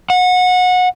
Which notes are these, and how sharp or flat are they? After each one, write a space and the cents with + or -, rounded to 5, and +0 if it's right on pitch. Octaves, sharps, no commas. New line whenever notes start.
F#5 -25